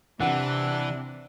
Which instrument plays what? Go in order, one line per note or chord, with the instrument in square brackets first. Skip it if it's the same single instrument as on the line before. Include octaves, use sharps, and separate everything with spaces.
[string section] C3 [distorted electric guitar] E3 [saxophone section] D4 [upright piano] F#5